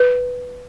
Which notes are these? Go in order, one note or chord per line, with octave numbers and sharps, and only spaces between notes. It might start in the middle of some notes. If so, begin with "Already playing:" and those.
Already playing: B4